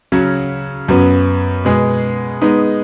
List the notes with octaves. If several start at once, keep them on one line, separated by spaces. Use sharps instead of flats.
C#3 F#3 C#4
F#2 F#3 B3
B2 G#3 B3 G#4
G#3 B3 D#4